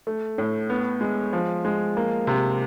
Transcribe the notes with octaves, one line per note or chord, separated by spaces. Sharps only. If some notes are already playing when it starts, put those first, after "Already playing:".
A3
A2
B3
G#3
F3
G#3
A#3
C3